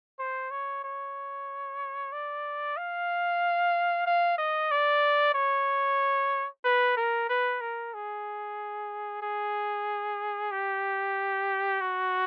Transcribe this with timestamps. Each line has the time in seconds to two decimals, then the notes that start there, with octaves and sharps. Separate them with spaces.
0.19 C5
0.51 C#5
0.84 C#5
2.12 D5
2.77 F5
4.07 F5
4.38 D#5
4.71 D5
5.35 C#5
6.65 B4
6.97 A#4
7.29 B4
7.61 A#4
7.94 G#4
9.22 G#4
10.52 G4
11.81 F#4